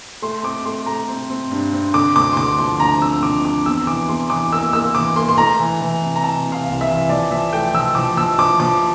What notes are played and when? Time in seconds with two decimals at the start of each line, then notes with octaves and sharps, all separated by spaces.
0.22 A3 C6
0.43 C4 D6
0.65 A3 C6
0.86 A3 A#5
1.08 C4
1.30 C4
1.51 G2
1.73 C4
1.94 D3 D6
2.16 D2 D6
2.33 C6
2.37 D3 D6
2.58 F3 C6
2.80 D2 A#5
3.01 C4 E6
3.23 F3 D6
3.44 C4 D6
3.66 E2 E6
3.87 E3 D6
4.09 E2 C6
4.30 E3 D6
4.52 A#3 E6
4.73 A#3 E6
4.95 E3 D6
5.16 A#3 C6
5.28 C6
5.38 A3 A#5
5.59 E3
5.81 E3
6.02 C3
6.16 A#5
6.23 C3 A5
6.46 C3
6.52 F5
6.67 C2
6.81 E5
6.88 E3
7.09 F3 D5
7.30 F3 E5
7.52 A3 G5
7.74 F3 E6
7.95 F3 D6
8.17 F3 E6
8.38 F3 D6
8.60 F3 D6